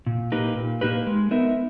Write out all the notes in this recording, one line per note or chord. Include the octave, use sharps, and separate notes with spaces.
A#2
A#3 D#4 G4 B4
A#2
A#3 D#4 G4 B4
G#3
B3 D#4 A#4 E5